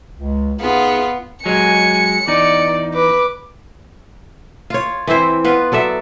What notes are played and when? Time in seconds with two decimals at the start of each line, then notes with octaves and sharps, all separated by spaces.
0.18 C#2
0.60 C3 B3 D#4 F4 G#4
1.46 F#3 G#3 G#5 C#7
2.28 E2 D#4 D5
2.94 B4 D6
4.70 F4 C#5
5.07 E3 C4 E4 C5
5.45 B3 F4 B4
5.72 F#3 A4 D5 E5